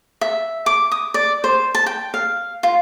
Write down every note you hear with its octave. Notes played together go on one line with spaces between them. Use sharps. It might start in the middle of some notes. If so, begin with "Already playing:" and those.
E5
D6
D#6
D5
C5
A5
G5
F5
F4